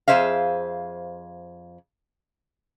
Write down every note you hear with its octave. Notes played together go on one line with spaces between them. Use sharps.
F2 E3 G#4 C5 E5 F5